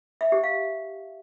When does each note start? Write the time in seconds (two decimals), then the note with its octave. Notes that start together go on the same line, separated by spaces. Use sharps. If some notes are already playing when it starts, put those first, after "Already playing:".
0.21 E5
0.32 G4
0.44 F5